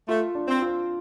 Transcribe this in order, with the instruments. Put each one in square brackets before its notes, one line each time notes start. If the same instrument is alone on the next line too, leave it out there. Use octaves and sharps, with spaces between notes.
[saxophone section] A3 [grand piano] F4
[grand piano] D4
[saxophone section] C4
[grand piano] F4